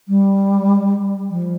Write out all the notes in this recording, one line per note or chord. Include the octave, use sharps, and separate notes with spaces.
G3
F3